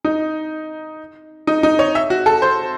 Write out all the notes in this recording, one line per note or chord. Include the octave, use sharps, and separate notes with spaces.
D#4
D#4
D#4
C#5
E5
F#4
A4
C5